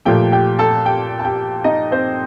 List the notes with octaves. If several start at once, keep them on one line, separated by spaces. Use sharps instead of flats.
A#2 F3 A3 G4 G5
G4 G5
A4 A5
G4 G5
A5
G4 G5
D#4 D#5
C4 C5